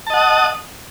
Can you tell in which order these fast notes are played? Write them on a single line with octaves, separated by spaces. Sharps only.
A5 D#5 F#5 D#6